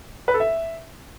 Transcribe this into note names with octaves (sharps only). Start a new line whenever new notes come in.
B4
A4
E5